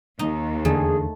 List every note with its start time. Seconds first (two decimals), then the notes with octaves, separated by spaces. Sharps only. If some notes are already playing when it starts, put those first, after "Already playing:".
0.19 D#2 D#4
0.65 E2 D3 A3 G#4